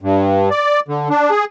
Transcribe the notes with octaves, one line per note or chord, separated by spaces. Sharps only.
G2
D5
D3
D4
G#4